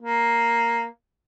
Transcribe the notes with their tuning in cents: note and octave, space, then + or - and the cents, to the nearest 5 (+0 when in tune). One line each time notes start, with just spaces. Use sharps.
A#3 +0